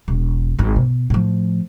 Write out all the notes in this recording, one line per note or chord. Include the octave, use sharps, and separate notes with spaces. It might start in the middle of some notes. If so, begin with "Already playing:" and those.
E1
G#1 G#2
B2
A2 F3